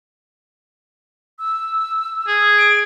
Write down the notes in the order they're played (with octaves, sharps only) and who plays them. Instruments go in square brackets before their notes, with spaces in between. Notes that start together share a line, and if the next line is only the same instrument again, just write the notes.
[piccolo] E6
[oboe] G#4
[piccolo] D7